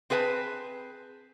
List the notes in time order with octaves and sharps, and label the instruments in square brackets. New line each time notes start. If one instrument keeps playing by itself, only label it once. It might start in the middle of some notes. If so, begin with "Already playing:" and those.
[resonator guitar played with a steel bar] C4 G#4 B4 F#5 A5